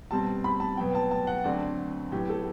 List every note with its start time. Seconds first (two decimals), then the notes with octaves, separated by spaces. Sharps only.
0.11 B2 G3 C4 A5
0.44 B5
0.60 A5
0.77 B2 F#3 B3 G5
0.95 A5
1.11 A5
1.27 F#5
1.44 D2 D3 F#3 A3 C4 D5
2.12 A2 F#3 B3 G4
2.29 A4